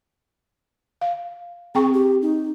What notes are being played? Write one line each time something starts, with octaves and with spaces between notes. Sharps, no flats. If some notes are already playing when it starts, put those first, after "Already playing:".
F5
C4 G#4 G5 C#6
G4
D#4